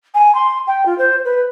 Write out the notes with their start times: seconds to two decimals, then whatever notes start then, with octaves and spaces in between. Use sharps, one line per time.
0.15 G#5
0.35 C6
0.67 G5
0.86 F4
0.98 C5
1.25 B4